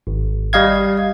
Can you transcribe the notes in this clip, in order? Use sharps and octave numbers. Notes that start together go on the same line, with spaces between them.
G#1
G3 D#5 F5 G#6